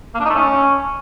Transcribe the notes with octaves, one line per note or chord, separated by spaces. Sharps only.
A#3
D4
D#4
A3
C#4